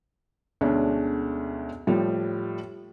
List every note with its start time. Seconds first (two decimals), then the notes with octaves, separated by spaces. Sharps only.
0.61 D2 B2 G#3 C#4 D4
1.87 A2 F3 G3